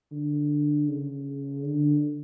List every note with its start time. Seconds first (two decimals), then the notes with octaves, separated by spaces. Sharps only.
0.12 D3
0.88 C#3
1.64 D3